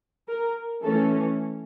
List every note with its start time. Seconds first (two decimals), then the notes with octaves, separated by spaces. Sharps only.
0.28 A#4
0.82 E3 A3 C#4 A4